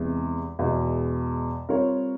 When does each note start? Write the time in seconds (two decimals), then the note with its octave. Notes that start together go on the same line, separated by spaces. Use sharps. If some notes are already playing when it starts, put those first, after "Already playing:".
Already playing: E2 C3 E3 G#3
0.59 E2 B2 G#3
1.69 G3 C4 F4 A#4 C#5